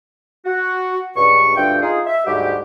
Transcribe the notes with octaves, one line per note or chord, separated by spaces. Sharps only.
F#4
C#2 G2 C#6
D2 G2 F4 E5 G5
D#4 F4 G#4
E5
D2 G#2 G3 F#4 G4